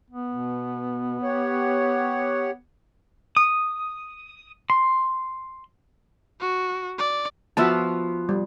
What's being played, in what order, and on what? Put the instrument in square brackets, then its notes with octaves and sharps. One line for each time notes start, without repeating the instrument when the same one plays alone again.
[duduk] B3
[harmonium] B2
G4 C#5 F#5
[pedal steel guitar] D#6
C6
[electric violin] F#4
D5
[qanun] F3 B3 F4 [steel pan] F#4 E5 A5
[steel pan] G3